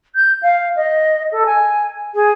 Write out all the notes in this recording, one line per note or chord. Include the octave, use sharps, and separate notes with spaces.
G6
F5
D#5
A4
G#5
G#4